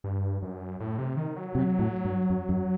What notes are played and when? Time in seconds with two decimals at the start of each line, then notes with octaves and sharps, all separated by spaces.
0.04 G2
0.42 F#2
0.80 A2
0.98 C3
1.17 D#3
1.36 F#3
1.55 C3
1.79 A2
2.05 G2
2.30 F#2
2.49 F#2